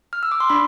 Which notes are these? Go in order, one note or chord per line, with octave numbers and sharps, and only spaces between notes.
F6
E6
D6
C6
D4 B5